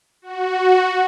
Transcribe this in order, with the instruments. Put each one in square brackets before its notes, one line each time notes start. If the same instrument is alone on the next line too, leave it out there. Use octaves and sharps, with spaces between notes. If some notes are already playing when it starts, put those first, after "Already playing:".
[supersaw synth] F#4